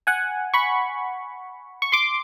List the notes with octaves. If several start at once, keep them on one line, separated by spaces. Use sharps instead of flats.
F#5 G#5
B5 C#6
C#6
C6 D6